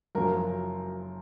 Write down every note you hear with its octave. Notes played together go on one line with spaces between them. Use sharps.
F#1 F#2 F3 A#4